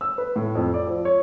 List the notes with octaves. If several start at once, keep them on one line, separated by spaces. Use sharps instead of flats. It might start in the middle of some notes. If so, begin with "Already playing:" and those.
E6
B4
A2
F2
D5
F3
C#5